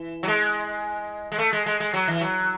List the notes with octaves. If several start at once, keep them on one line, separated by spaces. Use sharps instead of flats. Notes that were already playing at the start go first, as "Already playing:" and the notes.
Already playing: E3
F#3
G#3
G#3
A3
G#3
G#3
G#3
F#3
E3
F#3